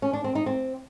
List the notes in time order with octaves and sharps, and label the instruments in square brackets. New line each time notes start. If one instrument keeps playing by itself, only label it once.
[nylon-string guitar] C#4
D4
C4
D#4
C4